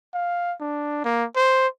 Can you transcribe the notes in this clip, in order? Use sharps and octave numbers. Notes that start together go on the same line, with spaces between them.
F5
D4
A#3
C5